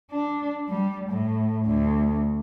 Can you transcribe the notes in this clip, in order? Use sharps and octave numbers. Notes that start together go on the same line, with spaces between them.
D4
G3
A2
D2